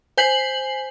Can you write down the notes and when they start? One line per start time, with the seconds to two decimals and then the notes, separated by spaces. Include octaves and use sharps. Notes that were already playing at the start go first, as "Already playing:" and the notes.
0.18 C5 G#5 G6 B6 C7 F#7